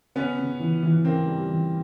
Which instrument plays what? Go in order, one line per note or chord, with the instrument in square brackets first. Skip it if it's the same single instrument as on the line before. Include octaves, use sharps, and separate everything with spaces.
[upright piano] C#3 [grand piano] B3 C#4
[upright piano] C#3
E3
E3
[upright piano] C#3 [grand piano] A#3 C4
[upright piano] G3
E3